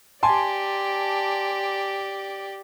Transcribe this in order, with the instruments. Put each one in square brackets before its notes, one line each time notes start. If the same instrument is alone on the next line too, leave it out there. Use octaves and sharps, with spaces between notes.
[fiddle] G4 D5 [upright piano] G#5 A5 C6